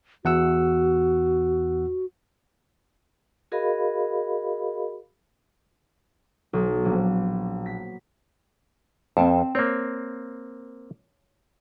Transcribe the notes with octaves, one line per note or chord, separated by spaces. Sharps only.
E2 F#4 F#5 E6
F#4 G#4 A#4 D#5 F5 B5
B1
A#1
B6
F2 C4 A5
A#3 C4 C#5